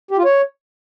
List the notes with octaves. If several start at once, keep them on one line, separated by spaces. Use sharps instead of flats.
G4
F4
C#5